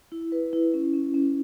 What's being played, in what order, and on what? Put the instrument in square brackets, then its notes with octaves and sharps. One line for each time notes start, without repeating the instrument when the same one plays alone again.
[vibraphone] E4
B4
E4
C#4
C#4
C#4